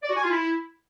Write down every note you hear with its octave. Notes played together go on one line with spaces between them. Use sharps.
D5
F#4
G#5
F4
E4